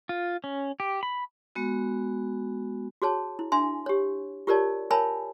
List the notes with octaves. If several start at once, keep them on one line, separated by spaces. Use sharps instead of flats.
F4
C#4
G4
B5
G#3 B3 F#4
F#4 G#4 C#5 A5
E4
D4 E5 G#5 C6
G4 C#5
F4 G4 A#4 C#5 D5 A5
A#4 C#5 E5 G#5 A5 B5